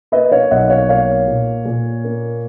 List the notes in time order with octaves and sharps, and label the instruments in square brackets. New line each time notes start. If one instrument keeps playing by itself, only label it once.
[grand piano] A#3 B4 D#5
C#5 F5
B1 D#5 F#5
C#5 F5
A#3 C#5 F5
A#2
A#2
A#3